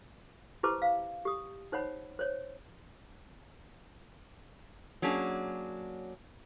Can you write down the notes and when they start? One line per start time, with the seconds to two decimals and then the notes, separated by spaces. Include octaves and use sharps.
0.63 E4 G4 B4 C5 A5 D6
0.82 F5
1.25 G4 D#6
1.72 D#4 C5 C#5 F#5 B5
2.19 C5 C#5
5.02 F#3 A#3 C#4 D4 G#4